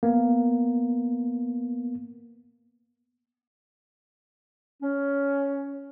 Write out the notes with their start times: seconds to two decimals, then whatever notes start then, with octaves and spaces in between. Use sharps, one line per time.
0.03 A#3 B3
4.82 C#4